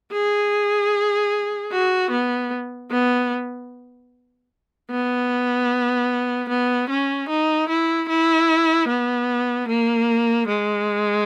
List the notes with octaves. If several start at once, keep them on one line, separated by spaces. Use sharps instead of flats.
G#4
F#4
B3
B3
B3
B3
C#4
D#4
E4
E4
B3
A#3
G#3